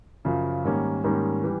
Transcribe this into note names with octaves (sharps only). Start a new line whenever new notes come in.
F#2 C#3 F3
G#2 D#3 G3 A#3 C#4
G#2 D#3 G3 A#3 C#4
E3 G3